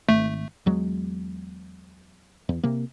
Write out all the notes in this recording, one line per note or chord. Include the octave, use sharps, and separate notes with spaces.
G#1 A3
E2 F#3 G#3
E2
C3 A#3